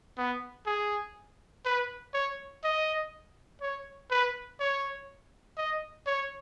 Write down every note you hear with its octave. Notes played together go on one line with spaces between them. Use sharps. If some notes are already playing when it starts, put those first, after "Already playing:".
B3
G#4
B4
C#5
D#5
C#5
B4
C#5
D#5
C#5